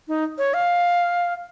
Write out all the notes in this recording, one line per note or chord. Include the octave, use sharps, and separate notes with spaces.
D#4
C#5
F5